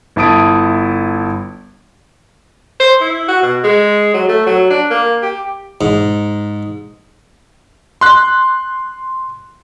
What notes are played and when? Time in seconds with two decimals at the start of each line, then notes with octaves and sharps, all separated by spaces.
0.16 G1 E4 A5 D#6 D7
2.80 C5
3.01 E4
3.28 F#4
3.42 B2
3.64 G#3
4.14 F#3
4.28 A3
4.46 F#3
4.70 D4
4.90 A#3
5.22 G4
5.81 G#2
8.01 C6 F#6